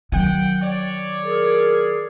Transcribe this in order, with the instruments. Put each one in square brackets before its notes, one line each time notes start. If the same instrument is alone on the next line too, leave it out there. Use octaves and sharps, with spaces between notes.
[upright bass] D#3 F#3 [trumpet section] F#5 G5
[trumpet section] C#5 D5
[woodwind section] G#4 [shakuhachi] A#4